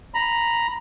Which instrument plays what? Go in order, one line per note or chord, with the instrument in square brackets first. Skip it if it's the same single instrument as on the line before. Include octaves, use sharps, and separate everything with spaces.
[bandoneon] A#5 B5